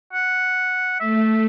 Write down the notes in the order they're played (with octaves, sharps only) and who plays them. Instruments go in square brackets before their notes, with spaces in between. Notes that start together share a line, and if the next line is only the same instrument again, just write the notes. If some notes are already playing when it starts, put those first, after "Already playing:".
[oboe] F#5
[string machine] A3 [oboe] E5